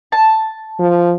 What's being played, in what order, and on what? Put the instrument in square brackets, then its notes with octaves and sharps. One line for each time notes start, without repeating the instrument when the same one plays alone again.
[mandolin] A5
[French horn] F3